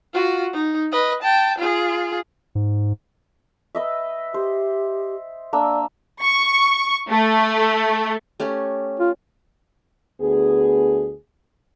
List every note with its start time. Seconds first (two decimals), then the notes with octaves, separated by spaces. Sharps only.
0.14 F4 F#4
0.54 D#4
0.92 B4 D#5
1.22 G5 A5
1.58 F4 G#4
2.55 G#2
3.75 B4 D#5 E5
4.34 G4 C5
5.53 A#3 D4 D5 E6
6.22 C#6
7.09 A3
8.40 A3 C#4 G4
9.00 F4
10.21 D2 B3 G#4